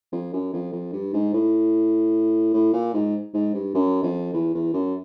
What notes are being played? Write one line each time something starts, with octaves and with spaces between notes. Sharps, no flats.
F2
F#2
F2
F2
G2
G#2
A2
A2
A#2
G#2
G#2
G2
F#2
F2
E2
E2
F#2